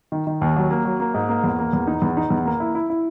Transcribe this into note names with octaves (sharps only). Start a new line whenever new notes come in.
D#3
D#3
D#2
F#3
A#3
F#3
A#3
G#2
A#3
E2
A#3
E2
D#4
E2
D#4
E2
A#3
E4
E4
E4